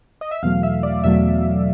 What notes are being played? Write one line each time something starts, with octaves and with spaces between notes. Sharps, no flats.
D#5
E5
E2 B2 F#3 A3 F5
E5
D5
E2 B2 F#3 A3 E5